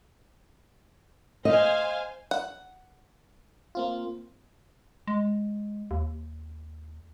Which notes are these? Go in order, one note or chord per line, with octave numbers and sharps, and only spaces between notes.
C5 D#5 F5 G#5
F#5
A#3 C4 F4
G#3
D#2